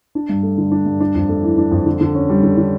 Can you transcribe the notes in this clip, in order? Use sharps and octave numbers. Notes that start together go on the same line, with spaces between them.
D4
G2
A3
D3
D4
G2
D4
F2
A3
E3
D4
F2
D3
D3
C#4
G3
D3
D3